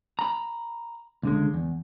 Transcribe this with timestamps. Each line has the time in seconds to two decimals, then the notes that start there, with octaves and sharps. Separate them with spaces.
0.19 A#5 B5
1.23 C#2 D3 G#3
1.54 E2